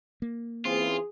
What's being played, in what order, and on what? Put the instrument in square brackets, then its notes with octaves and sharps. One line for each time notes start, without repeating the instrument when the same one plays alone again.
[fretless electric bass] A#3
[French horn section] C#3 E3 C4 [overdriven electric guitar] F4 [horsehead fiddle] G#4